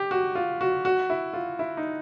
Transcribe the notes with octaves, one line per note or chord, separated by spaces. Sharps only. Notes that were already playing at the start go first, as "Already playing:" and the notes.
Already playing: G4
F#4
F4
F#4
F#4
E4
F4
E4
D#4